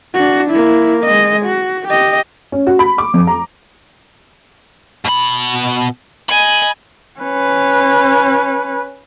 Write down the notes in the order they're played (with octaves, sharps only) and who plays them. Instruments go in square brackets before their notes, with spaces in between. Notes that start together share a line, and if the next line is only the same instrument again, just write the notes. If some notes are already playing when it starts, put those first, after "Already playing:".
[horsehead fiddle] D4 F#4
A#3 E4
G#3 D#5
F#4
G4 D#5
[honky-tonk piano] C#4
F#4
B5
D6
F2
A#5
[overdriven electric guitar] B2 B5
[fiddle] D#5 G#5 [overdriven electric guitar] B5
[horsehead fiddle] C#4 B4